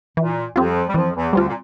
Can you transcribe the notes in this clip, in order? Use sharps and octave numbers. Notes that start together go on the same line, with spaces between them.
A#2 E3
F2 F3 G3 C4 F4
G3
F2 E3 F3
E2 E3
D2 D3 G3 C4 F4
A#2